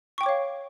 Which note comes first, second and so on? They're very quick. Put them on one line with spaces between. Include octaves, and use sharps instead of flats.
C#6 G5 D6 C#5 F5